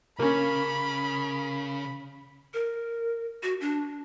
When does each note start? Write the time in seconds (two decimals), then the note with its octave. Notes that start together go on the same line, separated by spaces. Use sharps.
0.19 C#3 A#3 C#4 B5
2.54 A#4
3.43 F#4
3.61 D4